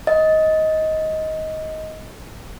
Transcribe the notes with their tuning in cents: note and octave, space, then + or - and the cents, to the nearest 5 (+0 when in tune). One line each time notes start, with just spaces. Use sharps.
D#5 +15